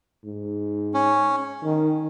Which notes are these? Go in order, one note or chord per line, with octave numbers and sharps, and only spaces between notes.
G#2
C#4
D#3